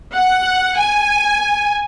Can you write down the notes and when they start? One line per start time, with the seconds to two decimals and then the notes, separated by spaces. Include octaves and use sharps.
0.15 F#5
0.77 G#5